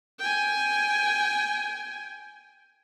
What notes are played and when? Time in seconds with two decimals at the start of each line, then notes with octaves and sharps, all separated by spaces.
0.19 G5 G#5